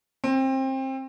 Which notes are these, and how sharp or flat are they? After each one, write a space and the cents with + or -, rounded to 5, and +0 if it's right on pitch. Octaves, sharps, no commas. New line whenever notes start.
C4 +25